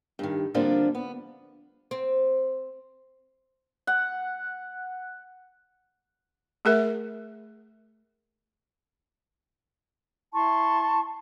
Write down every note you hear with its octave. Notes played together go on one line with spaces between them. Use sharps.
G2 D#3
D3 F3 G3 A#3 C4 D4
B3
C4
F#5
A3 G#4 A#4 E5
E4 A5 C6 C#6